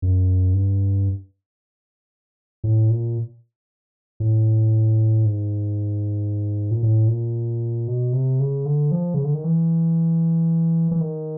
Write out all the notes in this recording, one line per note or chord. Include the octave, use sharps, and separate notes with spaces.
F#2
G2
A2
A#2
A2
G#2
A#2
A2
A#2
B2
C3
C#3
D3
F3
C#3
D3
D#3
E3
E3
D#3